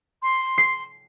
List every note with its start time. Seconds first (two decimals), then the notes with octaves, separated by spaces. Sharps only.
0.22 C6
0.58 C7